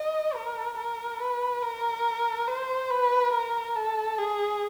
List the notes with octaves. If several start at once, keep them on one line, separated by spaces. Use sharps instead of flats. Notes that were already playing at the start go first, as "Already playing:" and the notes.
Already playing: D#5
A#4
A#4
B4
A#4
C5
B4
A#4
A4
G#4